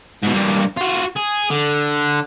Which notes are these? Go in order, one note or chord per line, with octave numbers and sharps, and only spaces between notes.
G#2 B2
G2 A#3
F4 F#4
G#4
D3